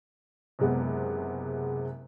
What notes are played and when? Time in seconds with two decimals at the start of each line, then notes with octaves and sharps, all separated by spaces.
0.59 F#1 C3 G#3 B3